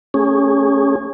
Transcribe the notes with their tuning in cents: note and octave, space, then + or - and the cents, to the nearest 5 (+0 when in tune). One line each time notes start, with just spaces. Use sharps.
A3 +10 C#4 +0 G#4 -25